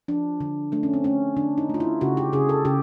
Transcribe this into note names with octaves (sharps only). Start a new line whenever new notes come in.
F3 D4
D3
A3 D4
C#4
C4
A3 C#4
D3 D4
D#4
A3 F4
E4
C#3 F#4
G4
C#3 G#4
A4
C#3 G4